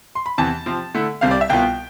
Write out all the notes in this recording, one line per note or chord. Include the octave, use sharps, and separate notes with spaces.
C6
B5
E2 C3 E3 A5
C3 F3 C4
D3 A3 E4
C2 C3 G3 F5
D5
E5
C2 B2 B3 F4 G5